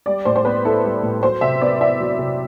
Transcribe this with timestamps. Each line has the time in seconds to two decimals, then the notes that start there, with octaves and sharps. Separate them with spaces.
0.06 G3 D5
0.25 A2 C5
0.36 C5
0.45 B3 B4
0.65 E4 A4
0.84 G3
1.03 A2
1.23 F#3 C5
1.41 C3 E5
1.61 B3 D5
1.81 E4 E5
2.00 F#3
2.19 C3